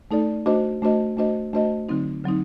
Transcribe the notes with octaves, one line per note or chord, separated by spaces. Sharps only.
A3 D#4 A4 D5
A3 D4 F#4 C5 D#5
A3 D4 F#4 C5 D#5
A3 D4 F#4 C5 D#5
A3 D4 F#4 C5 D#5
D3 F#3 C4 D#4
D3 F#3 C4 D#4